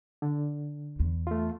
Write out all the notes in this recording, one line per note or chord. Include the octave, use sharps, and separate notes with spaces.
D3
E2
A3 F4